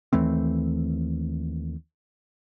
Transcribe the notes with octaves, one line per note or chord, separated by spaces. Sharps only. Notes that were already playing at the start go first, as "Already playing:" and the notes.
D#2 E3 A3 C4